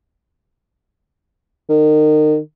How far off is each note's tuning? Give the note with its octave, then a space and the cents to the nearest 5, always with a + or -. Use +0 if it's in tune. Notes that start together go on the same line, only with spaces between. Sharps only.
D#3 -30